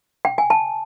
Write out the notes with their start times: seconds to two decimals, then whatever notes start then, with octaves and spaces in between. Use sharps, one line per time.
0.25 G5
0.38 G#5
0.50 A5